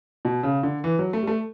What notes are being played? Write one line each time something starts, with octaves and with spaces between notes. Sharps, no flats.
B2
C#3
D3
E3
F#3
A3
G3
A3